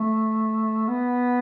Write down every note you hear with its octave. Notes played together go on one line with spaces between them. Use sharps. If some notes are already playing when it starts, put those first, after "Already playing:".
Already playing: A3
B3